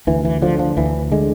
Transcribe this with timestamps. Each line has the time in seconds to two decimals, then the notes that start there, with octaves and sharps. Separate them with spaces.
0.07 D2 E3
0.25 E3
0.42 D3 F3
0.59 F3
0.77 D2 E3
1.12 D3 G#3